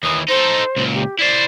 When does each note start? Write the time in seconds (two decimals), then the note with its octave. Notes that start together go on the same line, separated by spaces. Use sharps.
0.03 D#2 E3 D#6
0.28 D#4 A4 C5
0.76 C#2 A#2
0.94 G4
1.19 E4 C5 D5